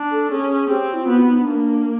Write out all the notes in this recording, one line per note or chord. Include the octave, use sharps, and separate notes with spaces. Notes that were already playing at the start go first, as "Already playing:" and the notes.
Already playing: D4
A4
C#4 G#4
C4 G4
E4
F4
B3 F#4
D#4
D4
A#3